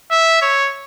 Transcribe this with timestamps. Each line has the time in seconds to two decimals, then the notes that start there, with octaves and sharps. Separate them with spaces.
0.11 E5
0.42 C#5